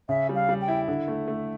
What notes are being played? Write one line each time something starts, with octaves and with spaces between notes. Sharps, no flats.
C#3 E5
G3
F5
G3
G5
E4
D3
A3
A3